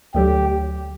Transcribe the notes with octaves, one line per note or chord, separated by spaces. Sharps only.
D2 D3 F#3 G4